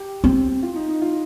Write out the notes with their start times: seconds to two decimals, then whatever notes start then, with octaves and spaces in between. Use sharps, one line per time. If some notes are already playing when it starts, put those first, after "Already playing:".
Already playing: G4
0.24 C4
0.63 F4
0.76 D#4
0.89 D#4
1.02 F4